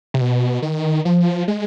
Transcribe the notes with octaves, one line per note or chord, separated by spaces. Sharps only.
C3
B2
D#3
F3
G#3